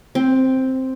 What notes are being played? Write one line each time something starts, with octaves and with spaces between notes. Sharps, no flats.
C4